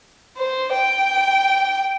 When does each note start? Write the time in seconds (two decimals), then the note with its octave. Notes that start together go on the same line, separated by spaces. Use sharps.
0.37 C5
0.73 G5